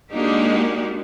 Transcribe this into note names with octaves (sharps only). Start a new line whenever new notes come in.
G#3 A#3 D4 D#4 F#4 G4